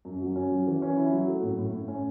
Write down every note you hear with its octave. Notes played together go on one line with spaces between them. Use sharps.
F#2
F#3
C#4
F#3
E3
C#4
E4
F#3
A3
A2
A2
A2
C#4